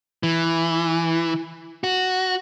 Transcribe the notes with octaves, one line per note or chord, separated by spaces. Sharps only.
E3
F#4